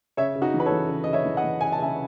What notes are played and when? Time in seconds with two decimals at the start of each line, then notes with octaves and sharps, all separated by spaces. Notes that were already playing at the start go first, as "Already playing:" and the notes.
0.17 C#3 C#5 E5
0.35 C#3
0.42 D#4 F#4
0.54 E3
0.60 B4
0.66 A4 C#5
0.72 E3
0.89 C#3
1.04 C#3 D#5
1.13 C#5 E5
1.25 E3
1.37 D#5 F#5
1.44 E3
1.61 C#3 G#5
1.72 A5
1.79 C#3 E5 G#5